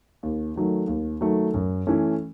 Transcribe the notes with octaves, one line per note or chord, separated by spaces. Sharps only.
D#2
D#3 F#3 A3
D#2
D#3 F#3 A3
F#2
E3 A3 C#4